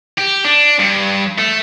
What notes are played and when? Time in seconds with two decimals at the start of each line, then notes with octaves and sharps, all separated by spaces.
0.18 G4
0.45 D4
0.79 G2
1.38 A3